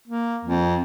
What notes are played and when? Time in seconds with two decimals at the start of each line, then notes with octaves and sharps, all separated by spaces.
0.07 A#3
0.45 F2